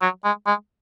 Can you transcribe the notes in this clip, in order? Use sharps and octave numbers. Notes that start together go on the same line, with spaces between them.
F#3
G#3
G#3